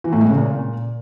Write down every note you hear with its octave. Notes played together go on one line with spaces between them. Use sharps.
E3
A2
G#3
C#3
A#2